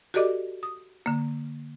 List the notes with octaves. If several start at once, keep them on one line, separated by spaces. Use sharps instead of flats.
F#4 G4 A4 D5 D#5 D6
D#6
D3 A#3